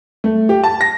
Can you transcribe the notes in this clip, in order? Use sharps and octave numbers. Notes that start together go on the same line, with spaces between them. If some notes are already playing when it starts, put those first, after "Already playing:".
A3
G4
A5
A#6